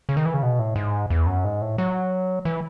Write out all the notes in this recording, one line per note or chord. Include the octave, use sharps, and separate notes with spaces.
C#3
D#3
E3
C#3
B2
A2
G#2
E2
F#2
G#2
A2
F#3
E3